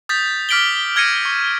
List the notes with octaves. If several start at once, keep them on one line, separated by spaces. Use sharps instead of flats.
D#6 G6 A6 B6
D6 F6 B6 D7 F#7 G7
F6 G#6 A#6 C#7 D#7
C#6